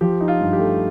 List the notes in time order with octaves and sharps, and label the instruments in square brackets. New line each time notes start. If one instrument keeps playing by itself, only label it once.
[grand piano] F3 G4
D#4
F4
G2
G4
A3